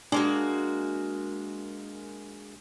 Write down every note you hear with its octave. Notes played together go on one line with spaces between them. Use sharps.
G#3 A#3 D4 F#4